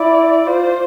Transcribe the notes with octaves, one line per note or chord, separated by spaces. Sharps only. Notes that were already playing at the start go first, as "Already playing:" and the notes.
Already playing: E4 D5
F4 C5